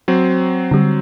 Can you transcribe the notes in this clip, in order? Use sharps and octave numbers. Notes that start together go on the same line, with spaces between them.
F#3 C4
D3 G3